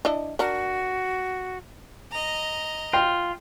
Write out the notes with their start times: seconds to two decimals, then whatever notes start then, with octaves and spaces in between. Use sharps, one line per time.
0.05 D4 E4 D#5
0.39 D4 F#4 A#4
2.12 D#5 A#5
2.93 F4 G5